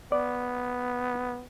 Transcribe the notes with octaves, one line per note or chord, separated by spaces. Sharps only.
B3 D5